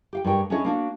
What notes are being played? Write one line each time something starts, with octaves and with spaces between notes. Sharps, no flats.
G4 F5 G5
G2 G#3 G4 A#4 C#5 G5
C#4 D4 E4 G#4 C#5 D#5
A#3 D4 F#4